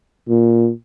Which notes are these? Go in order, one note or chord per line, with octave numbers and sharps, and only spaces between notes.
A#2